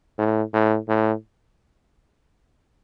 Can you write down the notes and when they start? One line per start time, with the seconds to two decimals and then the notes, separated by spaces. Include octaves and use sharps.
0.19 A2
0.53 A2
0.88 A2